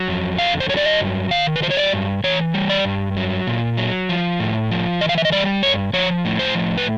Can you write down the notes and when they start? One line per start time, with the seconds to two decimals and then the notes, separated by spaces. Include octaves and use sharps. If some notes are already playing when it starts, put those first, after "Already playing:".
Already playing: F#3
0.08 F2
0.39 D3 F5
0.60 C5
0.69 F#3 C#5
0.77 D5
0.85 D#5
1.00 G2
1.31 D#3 F5
1.56 B4
1.62 F#3 C5
1.71 C#5
1.77 D5
1.93 G2
2.24 E3 C#5
2.54 G3
2.70 D5
2.85 G2
3.17 F#3
3.47 A#2
3.77 F#3
4.09 F3
4.40 A2
4.71 F3
5.01 E3 D#5
5.09 F5
5.18 E5
5.25 D#5
5.32 G3 D5
5.63 G2 C#5
5.93 F3 C#5
6.25 A2
6.39 C5
6.55 F3
6.78 B4